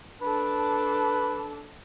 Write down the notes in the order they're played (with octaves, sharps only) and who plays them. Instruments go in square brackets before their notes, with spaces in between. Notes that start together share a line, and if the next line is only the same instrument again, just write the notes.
[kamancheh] D4 A4 [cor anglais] B4